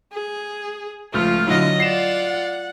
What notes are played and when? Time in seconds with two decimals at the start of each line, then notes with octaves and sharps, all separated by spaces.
0.13 G#4
1.14 C#2 F3 A3 F4 F6
1.47 D3 F#3 E4 D#5
1.80 F4 D5 F#5 C7 E7